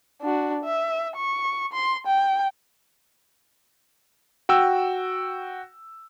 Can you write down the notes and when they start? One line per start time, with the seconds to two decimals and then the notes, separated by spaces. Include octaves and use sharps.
0.22 D4 F#4
0.64 E5
1.16 C#6
1.73 C6
2.07 G5
4.49 F#4 G5 E6